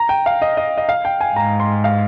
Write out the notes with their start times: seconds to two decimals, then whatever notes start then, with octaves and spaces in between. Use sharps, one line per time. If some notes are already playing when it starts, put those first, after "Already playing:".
Already playing: A#5
0.09 G5
0.26 F5
0.42 D#5
0.57 D#5
0.78 D#5
0.89 F5
1.05 G5
1.21 G#5
1.36 G#2 A#5
1.60 C6
1.84 F5